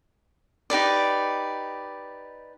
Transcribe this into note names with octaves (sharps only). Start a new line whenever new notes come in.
D#4 G4 B4 D5